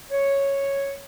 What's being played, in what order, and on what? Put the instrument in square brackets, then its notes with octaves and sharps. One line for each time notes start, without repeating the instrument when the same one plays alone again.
[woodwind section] C#5